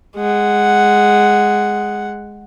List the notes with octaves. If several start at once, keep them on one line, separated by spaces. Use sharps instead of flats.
G#3 F#5